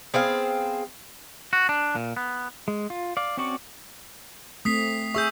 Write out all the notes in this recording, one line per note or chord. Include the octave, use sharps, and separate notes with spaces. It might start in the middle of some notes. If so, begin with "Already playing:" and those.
B3 C4 G#4 F5
F#4
D4
A#2
B3
G#3
F4
D5 F5
C4 C#4 F#4 D5 C#6
A3 C4 D#6 B6 C7
G#4 E5 C#6 E6 G6